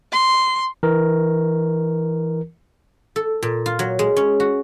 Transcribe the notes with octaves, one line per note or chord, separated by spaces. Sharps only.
C6
E3 A#4
A4
A#2
F4
F#3
G#3
C#4
F#4